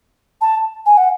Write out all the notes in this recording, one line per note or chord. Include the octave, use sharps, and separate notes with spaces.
A5
G#5
F#5